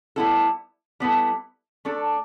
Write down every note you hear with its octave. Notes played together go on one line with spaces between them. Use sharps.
G3 B3 E4 A4
G3 B3 E4 A4
A3 D4 A4